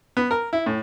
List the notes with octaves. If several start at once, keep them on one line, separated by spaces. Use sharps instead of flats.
B3
A#4
E4
A2